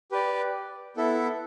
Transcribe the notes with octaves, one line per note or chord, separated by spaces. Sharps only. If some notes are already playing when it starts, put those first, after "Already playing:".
G4 B4 D5
B3 E4 A4 E5